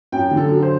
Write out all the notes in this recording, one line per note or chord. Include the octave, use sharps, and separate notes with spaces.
F#2 G5
D3
A4
F#3
C5